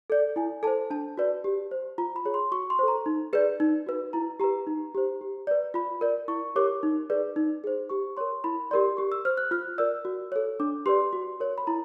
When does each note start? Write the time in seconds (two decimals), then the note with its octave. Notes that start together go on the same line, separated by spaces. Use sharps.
0.10 A4 D5
0.36 E4 G#5
0.63 A4 C5 A5
0.90 D4 A5
1.18 F#4 B4 D5
1.44 G4
1.71 C5
1.98 F4 A#5
2.16 B5
2.25 G#4 C#5
2.34 C6
2.52 F#4 C#6
2.70 C6
2.79 A4 C5
2.88 A#5
3.06 D#4
3.33 G#4 B4 D5
3.60 D#4
3.87 F#4 B4
4.13 E4 A#5
4.40 G4 B4 A#5
4.67 D#4
4.95 G4 C5
5.21 G4
5.47 B4 D5
5.74 F4 B5
6.01 A#4 D5
6.28 E4 C#6
6.56 G4 A#4 C#5 D6
6.83 D#4
7.10 G#4 B4 D5
7.36 D#4
7.64 G#4 C5
7.90 G4 C#6
8.17 A#4 C#5 C6
8.44 E4 B5
8.71 G4 A#4 D5 C6
8.97 G4 C#6
9.12 E6
9.25 C5 F6
9.37 F#6
9.51 F4 F6
9.78 A#4 D5 E6
10.05 F#4
10.32 A4 C#5
10.60 D4 D6
10.86 G4 B4 D5 C6
11.13 F#4
11.40 A#4 C#5
11.58 B5
11.67 E4 A#5